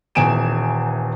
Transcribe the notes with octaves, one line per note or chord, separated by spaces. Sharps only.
D#1 E2 G#5 D7 E7